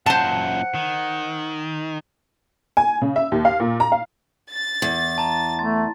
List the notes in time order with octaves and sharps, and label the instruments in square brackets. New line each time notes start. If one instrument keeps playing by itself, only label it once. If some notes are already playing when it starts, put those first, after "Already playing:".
[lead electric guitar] F#2 A#2 [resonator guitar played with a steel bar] C5 A5 [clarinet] F#5
[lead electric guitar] D#3
[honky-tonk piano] G#5
C#3
E5
D#2
F5
A#2
A#5
F5
[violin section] A6
[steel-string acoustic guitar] E2
[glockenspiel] A5 A#5
[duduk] A3 [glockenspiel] C6 A6